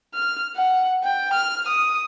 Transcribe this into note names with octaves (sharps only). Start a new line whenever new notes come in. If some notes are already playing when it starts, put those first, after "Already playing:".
F6
F#5
G5
F6
D#6